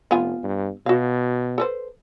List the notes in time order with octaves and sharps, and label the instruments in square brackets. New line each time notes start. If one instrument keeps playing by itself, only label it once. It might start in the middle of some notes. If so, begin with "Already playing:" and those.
[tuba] F1 [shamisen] B3 F4 G#5
[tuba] G2
[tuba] B2 [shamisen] F#4 F5
[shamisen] A4 B4 C5